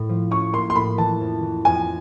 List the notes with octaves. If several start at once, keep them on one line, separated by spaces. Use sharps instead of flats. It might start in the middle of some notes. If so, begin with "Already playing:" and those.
Already playing: A2
F3
C#4 C#6
A#3 C6
C6
A2 B5
E3 A5
F2
E3
F2 G#5